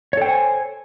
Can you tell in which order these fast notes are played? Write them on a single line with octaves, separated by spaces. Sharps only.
C#5 A4 G5 C5 G#5